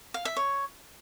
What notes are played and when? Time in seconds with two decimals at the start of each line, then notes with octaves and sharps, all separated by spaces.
0.14 F5
0.25 E5
0.36 C#5